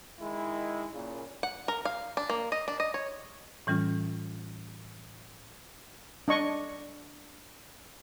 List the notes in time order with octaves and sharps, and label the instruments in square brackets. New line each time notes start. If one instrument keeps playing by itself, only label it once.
[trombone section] D#3 G#3 E4
A#2 C#3
[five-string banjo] F#5
A#4
F5
D4
A#3
D#5
D4
D#5
C#5
[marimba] A2 E3 G3 C#4 F4
[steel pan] D4 D#5 C#6